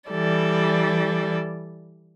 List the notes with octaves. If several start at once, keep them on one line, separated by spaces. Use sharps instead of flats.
E3 G3 A4 D5